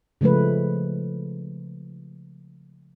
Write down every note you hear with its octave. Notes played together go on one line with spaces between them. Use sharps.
C#3 F3 G#3 A3 B4